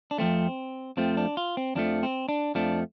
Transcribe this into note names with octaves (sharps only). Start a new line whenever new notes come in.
D4
F2 F3 A3 C4
F2 F3 A3 C4
D4
F4
C4
F2 F3 A3 D4
C4
D4
F2 F3 A3 D4